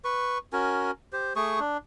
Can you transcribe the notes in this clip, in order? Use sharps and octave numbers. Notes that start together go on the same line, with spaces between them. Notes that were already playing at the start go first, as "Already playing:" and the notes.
B4 C#6
C#4 F#4 A#4 G#5
G4 C5
A3 G#4 C#6 D#6
D4